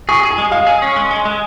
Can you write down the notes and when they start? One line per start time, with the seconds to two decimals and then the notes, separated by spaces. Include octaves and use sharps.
0.09 G#4 C#6
0.23 G#4
0.31 G#5
0.38 G#3
0.52 G#3 F5
0.67 G#4
0.82 C#4
0.96 G#3
1.11 G#3
1.25 G#3